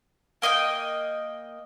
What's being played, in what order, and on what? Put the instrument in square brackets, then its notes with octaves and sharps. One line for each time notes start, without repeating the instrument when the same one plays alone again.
[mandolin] A#3 D#5 F5 G5